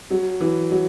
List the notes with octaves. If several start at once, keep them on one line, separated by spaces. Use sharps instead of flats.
F#3
E3
F#3